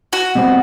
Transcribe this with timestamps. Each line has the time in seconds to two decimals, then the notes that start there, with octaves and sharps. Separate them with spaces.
0.13 F#4
0.35 B2 G3 C4